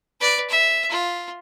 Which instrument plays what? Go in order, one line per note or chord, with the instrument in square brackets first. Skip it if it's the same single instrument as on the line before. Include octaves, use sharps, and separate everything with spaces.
[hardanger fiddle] B4 D5
E5
F4